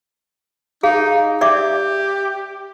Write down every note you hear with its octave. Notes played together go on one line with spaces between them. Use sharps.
D#4 G#4 F5
G4 D5 E5 D6